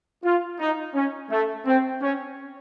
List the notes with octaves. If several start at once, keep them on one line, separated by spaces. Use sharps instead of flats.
F4
D#4
C#4
A3
C4
C#4